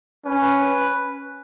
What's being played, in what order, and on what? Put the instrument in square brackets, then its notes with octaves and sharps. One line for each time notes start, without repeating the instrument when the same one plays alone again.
[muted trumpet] C#4 [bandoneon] B4
[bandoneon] B4
B4